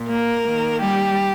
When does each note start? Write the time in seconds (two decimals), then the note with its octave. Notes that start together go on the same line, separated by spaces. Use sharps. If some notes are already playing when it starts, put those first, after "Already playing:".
Already playing: A#2
0.08 A#3 A#4
0.45 D#3 A#3
0.80 G3 G4